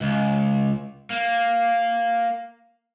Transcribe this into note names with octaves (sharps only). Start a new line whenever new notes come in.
C#2
A#3